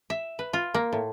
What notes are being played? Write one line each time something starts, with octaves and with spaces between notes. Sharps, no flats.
E5
B4
F4
A#3
A2